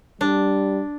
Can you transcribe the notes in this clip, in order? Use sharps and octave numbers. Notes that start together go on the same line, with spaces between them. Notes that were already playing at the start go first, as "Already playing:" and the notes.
G3 D4